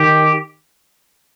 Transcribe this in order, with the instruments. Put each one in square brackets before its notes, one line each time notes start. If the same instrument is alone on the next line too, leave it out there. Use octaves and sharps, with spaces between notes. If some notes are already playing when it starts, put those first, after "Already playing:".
Already playing: [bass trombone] D#3 [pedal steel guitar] G4